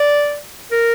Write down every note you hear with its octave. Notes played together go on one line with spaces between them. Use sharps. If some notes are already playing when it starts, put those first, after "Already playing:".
Already playing: D5
A#4